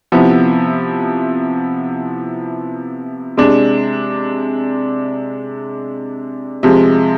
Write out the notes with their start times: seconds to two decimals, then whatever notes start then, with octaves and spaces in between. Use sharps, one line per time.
0.12 C3 F3 B3 E4
3.37 C3 G#3 D4
6.63 C3 F3 G#3